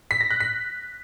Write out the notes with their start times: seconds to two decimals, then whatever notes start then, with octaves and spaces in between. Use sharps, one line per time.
0.11 B6
0.21 A#6
0.31 F#6
0.40 B6